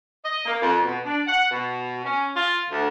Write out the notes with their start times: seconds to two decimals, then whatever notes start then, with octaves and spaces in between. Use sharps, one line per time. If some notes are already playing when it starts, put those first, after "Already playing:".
0.25 D#5
0.46 A#3
0.62 F2
0.84 B2
1.05 D4
1.27 F#5
1.51 B2
2.05 C#4
2.36 F4
2.71 D2